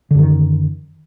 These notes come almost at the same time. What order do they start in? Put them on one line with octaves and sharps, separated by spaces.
D3 F#2 D#3